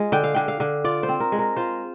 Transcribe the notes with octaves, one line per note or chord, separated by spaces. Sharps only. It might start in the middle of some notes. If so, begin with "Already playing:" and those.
Already playing: G#3 F4
D3 G5
F5
D3 G5
F5
D3
F4 D5
C5
C4
A#4
G#3
A#4
F4 C5